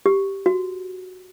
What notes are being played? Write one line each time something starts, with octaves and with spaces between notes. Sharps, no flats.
G4
F#4